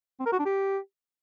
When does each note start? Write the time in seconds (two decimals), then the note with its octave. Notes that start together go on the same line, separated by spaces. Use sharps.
0.20 C4
0.26 A#4
0.33 F#4
0.39 D4
0.46 G4